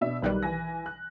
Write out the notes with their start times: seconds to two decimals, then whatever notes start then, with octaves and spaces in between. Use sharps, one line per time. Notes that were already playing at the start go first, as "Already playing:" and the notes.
0.01 B2 D4 E5
0.22 B1 D#3 G3 B4 F#6
0.43 E3 G#5 A#6
0.86 F#6